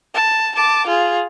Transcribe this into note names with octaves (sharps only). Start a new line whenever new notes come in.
A5
A5 D6
F4 G#4